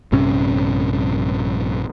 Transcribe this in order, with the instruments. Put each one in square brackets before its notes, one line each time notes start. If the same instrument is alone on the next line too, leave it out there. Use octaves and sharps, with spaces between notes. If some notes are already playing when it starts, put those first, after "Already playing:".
[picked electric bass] A#1 G2 C3 C#4